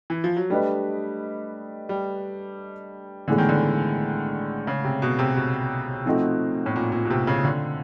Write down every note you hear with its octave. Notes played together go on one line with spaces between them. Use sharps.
E3
F3
F#3
G3 A3 D4 G4 B4 D#5
G3
A2 D3 E3 G#3 B3
D#3
D3
C#3
C3
B2
C3
B2
F3 A3 C4 D#4 F#4
A2
A#2
A#2
B2
C3
C#3
D3